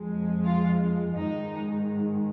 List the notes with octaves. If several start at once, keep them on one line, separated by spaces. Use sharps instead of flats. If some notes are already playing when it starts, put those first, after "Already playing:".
Already playing: F2 F3 G#3
F4
G#2 D#3 G#3 D#4